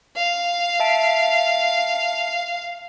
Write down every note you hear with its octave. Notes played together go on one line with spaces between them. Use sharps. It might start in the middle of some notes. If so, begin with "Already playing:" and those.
F5
E5 A5 D7